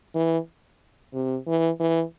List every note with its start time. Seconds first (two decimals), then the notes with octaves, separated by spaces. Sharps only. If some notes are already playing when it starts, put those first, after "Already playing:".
0.15 E3
1.14 C3
1.47 E3
1.80 E3